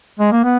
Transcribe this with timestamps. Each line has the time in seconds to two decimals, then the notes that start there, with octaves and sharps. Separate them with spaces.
0.19 G#3
0.32 A#3
0.44 B3